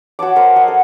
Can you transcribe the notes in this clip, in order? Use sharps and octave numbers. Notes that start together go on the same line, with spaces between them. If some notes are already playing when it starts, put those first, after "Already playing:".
F#4 C#5 A5 D6
A#4 C5
D#5 F#5 G#5
A4